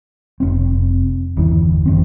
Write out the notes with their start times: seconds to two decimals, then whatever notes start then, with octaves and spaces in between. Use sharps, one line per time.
0.40 F1 C4
1.37 G1 E2 E3
1.86 F#2 E3 C4